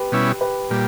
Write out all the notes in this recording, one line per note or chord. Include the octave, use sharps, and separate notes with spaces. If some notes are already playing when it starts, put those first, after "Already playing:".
Already playing: G4 B4
B2 G3 C#4 E4
G4 B4
A#2 G3